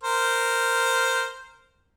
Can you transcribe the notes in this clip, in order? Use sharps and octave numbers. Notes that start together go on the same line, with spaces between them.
A#4 C5